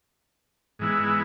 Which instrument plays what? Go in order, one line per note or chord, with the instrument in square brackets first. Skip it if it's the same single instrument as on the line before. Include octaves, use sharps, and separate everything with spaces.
[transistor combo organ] G#2 E3 G#3 B3 E4